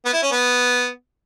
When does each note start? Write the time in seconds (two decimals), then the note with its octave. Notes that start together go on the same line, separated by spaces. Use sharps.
0.05 B3
0.13 E4
0.23 C#4
0.32 B3